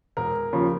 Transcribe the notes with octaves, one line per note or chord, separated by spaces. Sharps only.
E1 A#4
D#2 C#3 F3